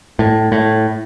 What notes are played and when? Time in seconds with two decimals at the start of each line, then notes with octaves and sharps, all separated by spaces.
0.19 A2
0.52 A2